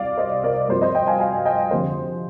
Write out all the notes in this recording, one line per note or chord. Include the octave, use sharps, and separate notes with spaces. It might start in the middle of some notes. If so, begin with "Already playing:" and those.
Already playing: C2 C3 G3 D5 F5
C5 D#5
A#4 D5
G2 F3 C4 C5
C5 D#5
D#5 G5
F5 G#5
F5 G#5
D#5 G5
F2 D3 G3 C4 C5